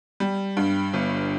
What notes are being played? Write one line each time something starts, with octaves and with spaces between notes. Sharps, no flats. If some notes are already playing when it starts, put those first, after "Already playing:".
G3
G2
G1